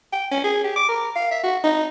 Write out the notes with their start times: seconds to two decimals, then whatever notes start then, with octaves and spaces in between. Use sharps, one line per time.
0.13 G5
0.31 C#4
0.44 G#4
0.64 G4
0.76 D6
0.88 A#4
1.16 F5
1.31 E5
1.43 F#4
1.64 D#4